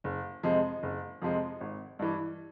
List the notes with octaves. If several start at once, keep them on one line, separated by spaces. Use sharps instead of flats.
F#1
F2 C3 F3 G#3
F#1
F2 C3 F3 G#3
G#1
G2 E3